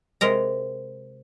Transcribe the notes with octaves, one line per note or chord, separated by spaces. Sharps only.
C3 G#3 A#4 A#5